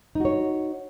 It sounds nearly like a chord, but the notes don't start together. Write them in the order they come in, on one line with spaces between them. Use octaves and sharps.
D#4 F#4 C#5